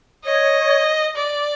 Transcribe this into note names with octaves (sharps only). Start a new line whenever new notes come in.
C#5 D#5
D5